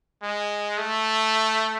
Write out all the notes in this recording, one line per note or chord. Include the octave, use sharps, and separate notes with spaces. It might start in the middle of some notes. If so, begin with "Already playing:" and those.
G#3
A3